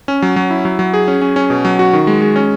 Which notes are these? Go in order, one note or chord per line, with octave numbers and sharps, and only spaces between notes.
C#4
F#3
F#3
E4
F#3
F#3
G#4
C#4
C#4
C#4
B2
F#3
F#4
D#3
G#3
G#3
C#4